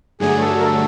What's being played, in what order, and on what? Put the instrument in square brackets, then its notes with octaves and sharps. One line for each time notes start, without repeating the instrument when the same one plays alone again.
[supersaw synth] G2 D3 F#3 A3 [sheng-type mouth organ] G#4
[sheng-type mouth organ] A4
A#4
A4